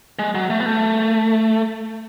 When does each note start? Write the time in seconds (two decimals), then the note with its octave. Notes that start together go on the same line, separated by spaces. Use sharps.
0.19 G#3
0.35 F#3
0.50 A3
0.60 B3
0.66 A3